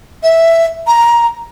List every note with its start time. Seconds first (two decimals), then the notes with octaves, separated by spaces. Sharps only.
0.23 E5
0.87 A#5